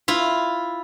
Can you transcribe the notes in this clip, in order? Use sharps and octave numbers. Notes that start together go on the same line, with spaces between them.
E4 F4